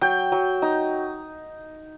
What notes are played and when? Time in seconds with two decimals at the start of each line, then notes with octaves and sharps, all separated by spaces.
0.01 F#3 G5
0.32 F#3
0.62 D#4